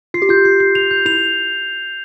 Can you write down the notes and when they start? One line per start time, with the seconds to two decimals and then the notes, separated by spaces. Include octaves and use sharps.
0.14 F4 C7
0.22 G4
0.29 F4 G6
0.45 C7
0.60 C7
0.75 F7
0.91 G6
1.06 E4 F7